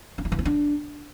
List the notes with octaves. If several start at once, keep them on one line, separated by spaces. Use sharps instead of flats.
C#4
E4
E3
C4
D4